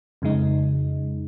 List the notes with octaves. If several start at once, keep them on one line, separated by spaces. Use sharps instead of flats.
F2 C#3 G#3 D#4